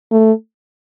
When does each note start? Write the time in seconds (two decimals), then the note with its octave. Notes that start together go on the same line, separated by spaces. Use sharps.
0.12 A3